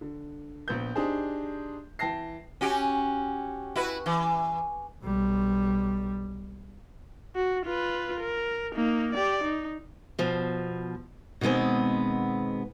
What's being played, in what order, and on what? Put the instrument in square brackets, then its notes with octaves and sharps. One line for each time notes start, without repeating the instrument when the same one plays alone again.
[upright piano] D3
A#1 B3 G6
D4 D#4 G4 G#4 C5
E3 G5 A5 A#6 C7
[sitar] C#4 F#4 G4
E4 F#4 B4
E3
[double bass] B1 G3
[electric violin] F#4
F4 B4
A#4
A#3 D#4
G4 D5
D#4
[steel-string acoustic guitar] B2 F3
B2 D#3 G#3 B3 C4